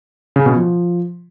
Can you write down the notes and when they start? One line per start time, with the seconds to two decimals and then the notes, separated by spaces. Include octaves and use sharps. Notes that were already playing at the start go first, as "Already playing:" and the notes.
0.36 C#3
0.46 B2
0.56 F3